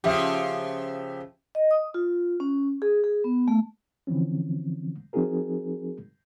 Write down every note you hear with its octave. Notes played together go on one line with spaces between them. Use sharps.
C#3 F3 G4 E5
D#5
D#6
F4
C#4
G#4
G#4
B3
A3
D3 E3 F3 C4 C#4
F3 C4 D#4 F#4 G#4 A#4